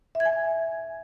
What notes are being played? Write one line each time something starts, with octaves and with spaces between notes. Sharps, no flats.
E5
G#6
G#5